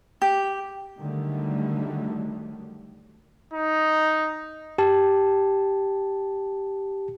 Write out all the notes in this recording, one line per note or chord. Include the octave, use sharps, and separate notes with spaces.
G4
D3 D#3 F#3 G3 A3
D#4
G4 A5